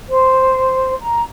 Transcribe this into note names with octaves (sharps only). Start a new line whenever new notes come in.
C5
A#5